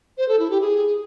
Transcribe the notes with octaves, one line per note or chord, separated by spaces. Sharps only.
C5
A4
E4
G4
G#4